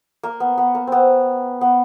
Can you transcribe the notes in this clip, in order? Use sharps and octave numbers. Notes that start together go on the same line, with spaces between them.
A#3
B3
B3
A#3
B3 C4
B3